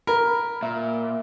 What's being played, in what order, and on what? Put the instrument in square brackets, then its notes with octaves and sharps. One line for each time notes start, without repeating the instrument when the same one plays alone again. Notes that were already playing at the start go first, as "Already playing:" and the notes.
[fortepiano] A#4 [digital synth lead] B5
[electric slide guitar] A#2 [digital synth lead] E5